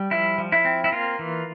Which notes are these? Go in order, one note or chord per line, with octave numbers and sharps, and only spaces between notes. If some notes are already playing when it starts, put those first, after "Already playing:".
Already playing: G3
F3 E4
F3
E4
C4
E4
A#3 F4
E3